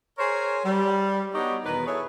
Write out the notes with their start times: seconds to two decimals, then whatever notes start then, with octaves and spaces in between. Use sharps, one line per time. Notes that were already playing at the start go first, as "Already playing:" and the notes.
0.18 G#4 A#4 C5 C#5
0.65 G3
1.35 B3 D4 D#4 F#4 G4 C#5
1.66 E2 B2 D#3 A#4 B4
1.87 E4 G#4 A4 C#5